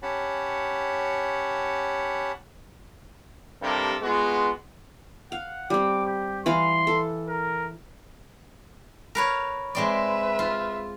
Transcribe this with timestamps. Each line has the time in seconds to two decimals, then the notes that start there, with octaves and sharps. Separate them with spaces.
0.02 C#4 G4 C#5 F#5 A5 B5
3.61 G2 C3 A4 A#4
4.02 G#3 B3 F4 F#4
5.32 F5 F#5
5.70 G3 C4 D6
6.06 G4
6.46 E3 B4 F5 C6
6.87 A4
7.28 A#4
9.15 A#4 B4 C#5
9.75 G#3 C4 B4 D5 E5
10.39 F4